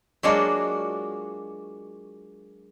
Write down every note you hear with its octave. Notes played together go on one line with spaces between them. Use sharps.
F#3 G#3 A#3 D4 F4 F#4